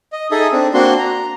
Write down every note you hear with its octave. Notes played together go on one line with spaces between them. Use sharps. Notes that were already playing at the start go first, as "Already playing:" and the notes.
D#5
D#4 G#4 A4 D#5 E5 D#6
C4 D4
A#3 C4 D4 F#4 C6
A#5